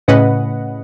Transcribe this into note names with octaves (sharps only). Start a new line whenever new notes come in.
A2 C#3 C#4 B4 D#5 F#5